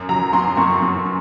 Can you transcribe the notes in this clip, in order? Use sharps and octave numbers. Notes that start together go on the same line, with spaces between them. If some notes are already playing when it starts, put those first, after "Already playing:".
Already playing: F#2
F#3 A#5
F#2 C6
F#2 C#6
F#2